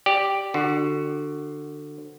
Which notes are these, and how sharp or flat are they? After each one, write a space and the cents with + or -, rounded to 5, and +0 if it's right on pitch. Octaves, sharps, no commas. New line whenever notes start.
G4 +0 D5 +0
D3 +20 F#4 +0